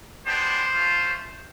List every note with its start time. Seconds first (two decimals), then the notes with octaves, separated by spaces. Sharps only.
0.24 G#3 B3 D4 G4 C5
0.74 A3 C#4 F4